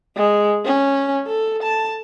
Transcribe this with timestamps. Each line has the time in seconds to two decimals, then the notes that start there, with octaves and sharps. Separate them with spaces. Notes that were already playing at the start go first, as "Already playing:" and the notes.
0.16 G#3
0.65 C#4
1.27 A4
1.63 A5